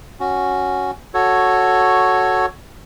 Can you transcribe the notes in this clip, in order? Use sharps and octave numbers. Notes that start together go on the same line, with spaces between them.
C#4 F#4
F#4 A4 C#5